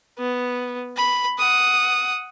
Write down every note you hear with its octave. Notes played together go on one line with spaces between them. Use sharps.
B3
B5
F#5 D#6